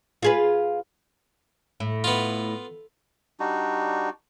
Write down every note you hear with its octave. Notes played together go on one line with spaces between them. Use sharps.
F4 G#4 B4
A2
B3 F4
G3 D4 D#4 F#4